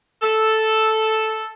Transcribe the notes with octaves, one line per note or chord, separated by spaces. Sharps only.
A4